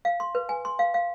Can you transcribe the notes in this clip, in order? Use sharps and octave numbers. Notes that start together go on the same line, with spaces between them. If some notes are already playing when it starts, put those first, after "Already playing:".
F5
C6
B4
G#5
C6
F5
F5